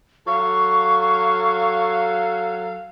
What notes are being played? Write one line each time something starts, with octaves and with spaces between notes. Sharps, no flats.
F#3 A4 F5 C#6